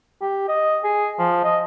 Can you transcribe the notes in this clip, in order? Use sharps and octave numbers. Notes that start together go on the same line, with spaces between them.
G4
D#5
G#4
F3
D#5